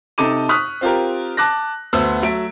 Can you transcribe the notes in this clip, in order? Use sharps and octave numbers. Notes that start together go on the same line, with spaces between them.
C3 D#4 A4 A5 D6 D#7
C#6 D#6 F6 F#6 B6
C4 F4 G4 A#4
A5 D6 F#6 A#6
D2 B3 C5 E6
F#3 A3 E5 D7